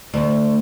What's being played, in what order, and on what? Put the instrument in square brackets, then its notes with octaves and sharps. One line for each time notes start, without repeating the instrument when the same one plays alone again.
[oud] D2